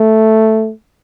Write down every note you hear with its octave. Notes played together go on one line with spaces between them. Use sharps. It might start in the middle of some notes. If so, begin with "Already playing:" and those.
Already playing: A3